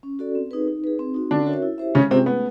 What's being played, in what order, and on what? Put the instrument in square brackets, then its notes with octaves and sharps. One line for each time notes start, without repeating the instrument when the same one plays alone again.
[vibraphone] C#4
F#4 A4 D5
C4
D#4 G#4 B4
D#4
G#4 B4
C4
D#4 F#4
[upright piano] D3 D4 [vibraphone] C#4
[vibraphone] F#4 A#4 C#5 E5
E4
G4 C5 E5
[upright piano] C#3 C#4 [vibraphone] G#3
[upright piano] C3 C4 [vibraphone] C#4 F4 G#4
[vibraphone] A3 [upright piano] B3